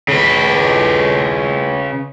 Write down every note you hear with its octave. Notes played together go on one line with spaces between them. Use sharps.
C#3 B4